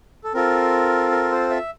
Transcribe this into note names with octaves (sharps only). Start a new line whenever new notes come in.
A4
C4 F4 A4 A#4
A#4
C5
E5